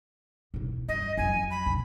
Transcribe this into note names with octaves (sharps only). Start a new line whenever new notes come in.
B1 E3
G2 D#5
F2 F#3 G#5
B5
B1